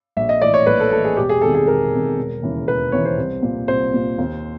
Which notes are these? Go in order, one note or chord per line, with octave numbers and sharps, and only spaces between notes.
A#1 E5
D#5
A2 E3 D5
C#5
A#1 B4
A4
A2 A4
E3
G#4
E1 G4
G#4
E2 C3 D#3 A4
G#4
E1 A#4
E2 C3 D#3
E1
D#2 C#3 E3
E1 B4
D#2 C#3 E3 C#5
C5
C2
A#2
C2 C5
A#2
D#2